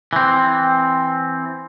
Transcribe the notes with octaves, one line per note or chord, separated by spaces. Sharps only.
E3 C4